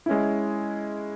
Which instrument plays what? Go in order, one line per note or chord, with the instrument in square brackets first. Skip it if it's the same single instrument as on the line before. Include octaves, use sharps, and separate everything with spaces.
[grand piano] G#3 C#4 E4